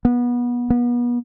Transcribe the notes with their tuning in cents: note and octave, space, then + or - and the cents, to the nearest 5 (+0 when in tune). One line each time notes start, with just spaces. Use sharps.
B3 -25
B3 -35